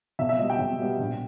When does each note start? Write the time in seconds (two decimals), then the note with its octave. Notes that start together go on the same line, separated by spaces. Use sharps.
0.19 B1 E5
0.29 E5
0.39 B2 G3 D#5
0.50 G5
0.59 B1
0.79 B2 G3
0.99 A#1